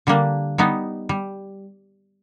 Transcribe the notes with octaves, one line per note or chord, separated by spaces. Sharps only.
D3 G3 A#3 D4
G3 B3 D#4
G3